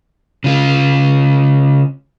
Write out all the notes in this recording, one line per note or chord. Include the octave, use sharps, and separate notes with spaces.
C#3 F4